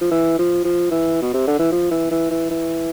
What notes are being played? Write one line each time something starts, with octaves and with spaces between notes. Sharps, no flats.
F3
E3
F3
F3
E3
B2
C3
D3
E3
F3
E3
E3
E3
E3